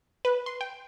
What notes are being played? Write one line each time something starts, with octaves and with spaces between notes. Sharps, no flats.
B4
C6
G5